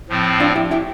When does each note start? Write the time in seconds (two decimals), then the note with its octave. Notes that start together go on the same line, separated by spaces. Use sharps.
0.09 A2 F3 C4
0.40 D4 F4
0.56 E4 G4
0.71 E4 G4